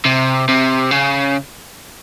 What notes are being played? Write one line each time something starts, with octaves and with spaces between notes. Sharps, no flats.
C3
C3
C#3